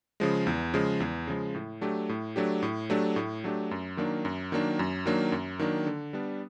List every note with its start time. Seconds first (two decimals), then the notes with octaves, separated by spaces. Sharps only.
0.20 C#3 F3 G#3
0.47 E2
0.74 C#3 F3 G#3
1.00 E2
1.27 C#3 F3 G#3
1.55 A2
1.81 F#3 A3 D4 G4
2.09 A2
2.36 F#3 A3 D4 G4
2.63 A2
2.90 F#3 A3 D4 G4
3.16 A2
3.44 F#3 A3 D4 G4
3.71 F#2
3.97 D#3 F#3 A#3 D4
4.25 F#2
4.52 D#3 F#3 A#3 D4
4.79 F#2
5.06 D#3 F#3 A#3 D4
5.32 F#2
5.59 D#3 F#3 A#3 D4
5.86 D3
6.13 G3 B3 D4